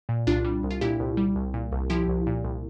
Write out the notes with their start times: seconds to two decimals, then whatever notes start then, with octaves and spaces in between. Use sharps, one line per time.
0.09 A#2
0.27 C2 D4 F4
0.44 G3
0.63 C2
0.71 F4
0.81 A#2 E4 G4
1.00 C2
1.17 G3
1.36 C2
1.54 A#2
1.72 C2
1.90 F3 E4 G4
2.08 C2
2.27 A#2
2.44 C2